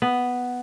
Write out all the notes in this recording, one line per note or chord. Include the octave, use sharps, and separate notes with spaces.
B3